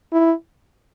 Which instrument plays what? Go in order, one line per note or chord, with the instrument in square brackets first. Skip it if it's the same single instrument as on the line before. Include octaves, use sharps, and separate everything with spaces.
[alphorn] E4